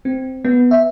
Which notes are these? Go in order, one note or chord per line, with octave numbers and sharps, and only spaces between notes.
C4
B3
E5